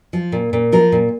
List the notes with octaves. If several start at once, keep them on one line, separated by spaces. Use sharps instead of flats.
F3
A#2
A#2
F3 A#4
A#2